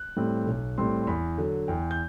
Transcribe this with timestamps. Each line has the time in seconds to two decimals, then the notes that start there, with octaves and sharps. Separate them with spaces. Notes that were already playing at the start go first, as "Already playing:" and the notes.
Already playing: F#6
0.17 A2 G3 C4
0.47 B1
0.78 A2 G3 C4 C6
1.03 C6
1.07 E2 B5
1.38 D3 F#3
1.68 E2 G5
1.91 G6